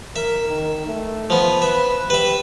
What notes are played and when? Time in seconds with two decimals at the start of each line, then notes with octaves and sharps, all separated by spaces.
0.16 A#4 E5
0.48 D#3
0.87 A3
1.30 F3 B3
1.62 B4 E5
2.10 G4 B4 E5